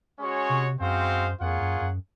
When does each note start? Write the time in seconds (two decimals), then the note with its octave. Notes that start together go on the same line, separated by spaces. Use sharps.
0.20 G#3 C#4 F#4 C#5
0.49 C3
0.79 F#2 G#3 C4 F#4 C5 F5
1.40 F2 A#3 F4 G#4 C#5 F#5
1.61 F#2
1.81 F#2